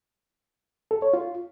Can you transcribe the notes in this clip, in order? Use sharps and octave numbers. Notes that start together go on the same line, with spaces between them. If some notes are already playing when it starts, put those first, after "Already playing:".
A4
C#5
F4